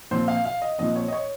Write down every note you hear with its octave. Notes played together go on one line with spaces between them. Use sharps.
A#2 F3 C4 C5
F5
F5
D#5
A#2 F3 C4 D#5
C#5
D#5
C#5